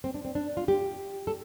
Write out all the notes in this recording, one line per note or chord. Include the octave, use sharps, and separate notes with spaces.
C4
D4
C4
D4
F4
G4
A4